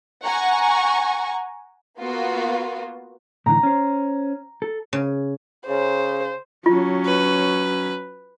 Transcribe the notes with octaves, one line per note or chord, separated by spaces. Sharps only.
F#5 G#5 A#5 C#6
A#3 B3 F4 F#4
A2 D3 E3 A#5
C#4 C5
A4
C#3
C#3 C5
F#3 C#4 F4
B4